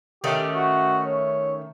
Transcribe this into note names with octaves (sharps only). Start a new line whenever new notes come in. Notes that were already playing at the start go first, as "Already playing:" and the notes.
D#3 A3 C#4 G4
F#4
C#5